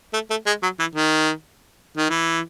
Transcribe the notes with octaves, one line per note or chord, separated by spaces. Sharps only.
A3
A3
G#3
F#3
E3
D#3
D#3
E3